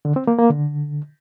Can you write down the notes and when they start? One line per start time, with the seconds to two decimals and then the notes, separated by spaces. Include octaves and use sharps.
0.05 D3
0.16 C4
0.27 A#3
0.39 A#3
0.50 D3